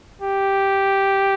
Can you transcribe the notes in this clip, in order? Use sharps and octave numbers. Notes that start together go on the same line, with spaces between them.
G4